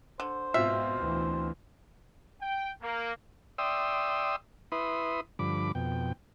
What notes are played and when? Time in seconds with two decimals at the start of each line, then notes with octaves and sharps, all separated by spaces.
0.20 D3 C5
0.54 G#2 B2 C4 F4 E5
0.98 D2 E3
2.41 G5
2.81 A#3
3.58 D5 E5 G5 C6 D#6 E6
4.72 E4 B4 E5 B5 C6 D#6
5.39 G2 D3 F3 B5 D6
5.75 F2 B2 G5